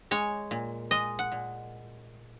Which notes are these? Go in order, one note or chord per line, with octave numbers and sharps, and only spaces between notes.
G#3 C#5
A#2
G#3 D#5
F#5
A#2